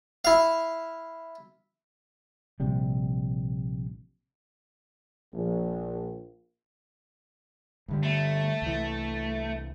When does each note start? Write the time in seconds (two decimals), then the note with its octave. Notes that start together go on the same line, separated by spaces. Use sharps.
0.25 E4 F5
2.60 A#1 C3 G3
5.34 A#1
7.88 G2 D3 G3
8.03 A3
8.62 C2 E3